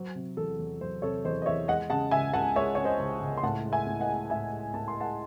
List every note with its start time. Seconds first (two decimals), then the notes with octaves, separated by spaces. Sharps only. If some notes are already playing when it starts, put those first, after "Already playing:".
Already playing: F#3 C5
0.15 C3
0.37 E2 A4
0.59 E2
0.81 F#3 C5
1.02 C3 A4 C#5
1.24 E2 C5 D#5
1.42 D#5
1.46 E2 C#5 E5
1.68 G#3 D#5 F#5
1.90 C#3 F#5 A5
2.11 C#2 E5 G#5
2.33 C#2 F#5 A5
2.56 G#3 C#5 E5
2.75 C#3 C#5
2.84 C5 D#5
2.99 C#2
3.21 C#2
3.38 C6
3.43 A2 F#5 A5
3.64 G#3
3.72 E5 G#5
3.87 A2
4.01 D#5 F#5
4.09 G#3
4.30 A2 E5 G#5
4.52 G#3
4.74 A2 A5
4.88 C6
4.96 G#3 F#5 A5